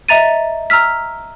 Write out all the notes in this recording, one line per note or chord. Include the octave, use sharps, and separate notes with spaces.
D#5 E5 A#5 A6 D#7
A#5 E6 F6 B6